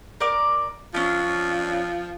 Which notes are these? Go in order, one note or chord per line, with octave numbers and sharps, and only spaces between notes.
A#4 D5 D6
F3 C#4 D4